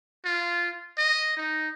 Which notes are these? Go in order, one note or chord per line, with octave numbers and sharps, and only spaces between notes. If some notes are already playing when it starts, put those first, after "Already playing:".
F4
D#5
D#4